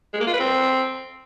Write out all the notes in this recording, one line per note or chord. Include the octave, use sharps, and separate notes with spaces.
G#3
A#3
F4
B4
C4